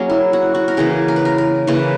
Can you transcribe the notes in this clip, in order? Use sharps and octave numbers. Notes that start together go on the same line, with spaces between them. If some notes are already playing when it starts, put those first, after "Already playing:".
Already playing: F#3 A#3 C#4 G#4
E4
F#4
F#4
A#4
C#3 E3 A#3 G#4
A#4
B4
A#4
A#4
C#3 E3 A#3 B4